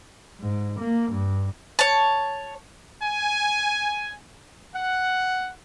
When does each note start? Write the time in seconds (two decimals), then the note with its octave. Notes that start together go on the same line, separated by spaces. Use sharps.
0.40 G#2
0.79 A#3
1.11 G2
1.79 C#5 A5
3.03 G#5
4.75 F#5